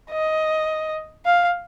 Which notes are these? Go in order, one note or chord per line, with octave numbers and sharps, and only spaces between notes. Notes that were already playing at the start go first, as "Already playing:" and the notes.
D#5
F5